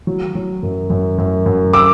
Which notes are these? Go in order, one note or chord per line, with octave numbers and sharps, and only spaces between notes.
F#3
F#3
F#2
F#2
F#2
F#2
D6 E6